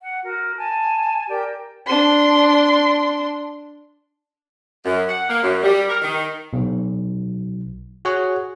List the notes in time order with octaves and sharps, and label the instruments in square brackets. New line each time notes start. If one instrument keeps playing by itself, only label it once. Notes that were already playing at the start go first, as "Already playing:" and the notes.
[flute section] F#5
F#4 A#4
G#5 A5
G4 A#4 D5 G5
[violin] D4 C6
[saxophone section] F#2
F#5
A#3
F#2
G3
A#4
D#3
[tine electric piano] B1
F#4 G#4 C#5 F#5